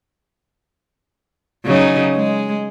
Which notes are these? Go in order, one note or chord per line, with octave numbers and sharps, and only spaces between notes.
C#3 F#3 D#4
G#3